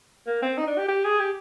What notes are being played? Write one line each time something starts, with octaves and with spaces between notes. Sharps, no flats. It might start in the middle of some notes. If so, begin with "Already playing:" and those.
A#3
C4
D#4
D4
G4
G4
G#4
G4